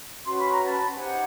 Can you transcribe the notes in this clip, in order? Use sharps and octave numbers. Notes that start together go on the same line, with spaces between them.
C#4 F#4 B4 C6
B5
A#5
A5 B5
D#4 G4 C5 F#5 G#5